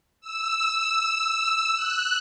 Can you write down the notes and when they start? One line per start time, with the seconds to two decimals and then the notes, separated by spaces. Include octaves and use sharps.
0.21 E6
1.75 F#6